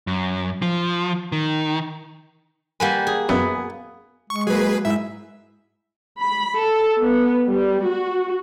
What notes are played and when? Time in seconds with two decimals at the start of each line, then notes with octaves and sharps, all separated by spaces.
0.07 F#2
0.62 F3
1.32 D#3
2.80 G3 A#3 B4 F#5 G#5
3.07 G#4
3.29 F#2 B3
4.30 G#3 C#6
4.47 F#3 A#3 G#4 B4
4.85 G#2 E4 E5
6.20 B5
6.57 A4
7.00 B3
7.47 G3
7.87 F#4